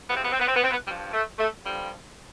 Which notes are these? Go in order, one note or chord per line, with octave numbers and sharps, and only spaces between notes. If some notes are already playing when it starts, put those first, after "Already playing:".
E2 C3 F3 B3
C4
B3
C4
B3
C4
B3
C4
B3
G2 F3 G3
A3
A3
G2 D3 F3 G3